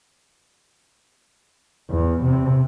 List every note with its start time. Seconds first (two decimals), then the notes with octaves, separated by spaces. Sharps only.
1.90 E2
2.23 C3